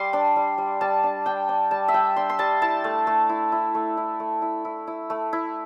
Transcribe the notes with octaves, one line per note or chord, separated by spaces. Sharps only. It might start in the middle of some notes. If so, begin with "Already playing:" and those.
Already playing: G3 C6 D6
D4
G3
G3
G3 A5
D4
D4 G5
D4
G3 A5
E5
G3 G5
D4 C6
C6
G3 A5
E4 A5
A3
A3
E4
E4
A3
E4
A3
E4
E4
E4
A3
E4